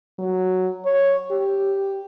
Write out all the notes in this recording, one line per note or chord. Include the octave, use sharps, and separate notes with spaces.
F#3
C#5
G4